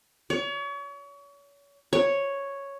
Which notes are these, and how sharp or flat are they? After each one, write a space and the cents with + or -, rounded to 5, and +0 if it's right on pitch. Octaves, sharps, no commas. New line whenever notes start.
C#5 +35
C#5 +0